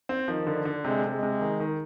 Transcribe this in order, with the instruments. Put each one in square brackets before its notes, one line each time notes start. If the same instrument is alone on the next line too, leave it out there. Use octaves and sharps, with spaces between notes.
[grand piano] C4
[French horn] D#3 [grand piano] F3
[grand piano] D3
D3
[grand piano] C3 [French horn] G#3
[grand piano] C3
[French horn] G#3
[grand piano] C3
D#3
D#3